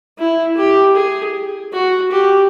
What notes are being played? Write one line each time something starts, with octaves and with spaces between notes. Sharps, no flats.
E4
G4
G#4
F#4
G4